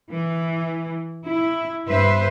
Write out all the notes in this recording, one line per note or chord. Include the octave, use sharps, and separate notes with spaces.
E3
E4
G2 B4 C5 E5